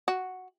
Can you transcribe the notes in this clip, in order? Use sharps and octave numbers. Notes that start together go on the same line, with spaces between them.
F#4